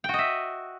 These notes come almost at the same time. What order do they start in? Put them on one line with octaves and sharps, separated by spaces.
G5 F#4 D#5 E5